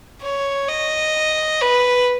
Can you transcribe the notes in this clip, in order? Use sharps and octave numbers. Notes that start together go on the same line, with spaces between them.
C#5
D#5
B4